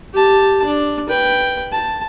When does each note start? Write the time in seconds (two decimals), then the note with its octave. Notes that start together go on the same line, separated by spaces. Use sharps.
0.13 G4 A5
0.64 D4
1.09 B4 G5
1.72 A5